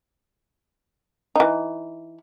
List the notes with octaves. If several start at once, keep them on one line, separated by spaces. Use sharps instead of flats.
E3 D#4